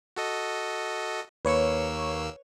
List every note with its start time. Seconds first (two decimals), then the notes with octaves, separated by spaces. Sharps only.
0.17 F#4 A4 D#5
1.45 D#2 A#3 B4 C#5 C#6 E6